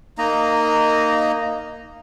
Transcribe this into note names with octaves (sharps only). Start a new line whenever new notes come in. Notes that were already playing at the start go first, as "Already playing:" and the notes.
A#3 D#4 D#5 A#5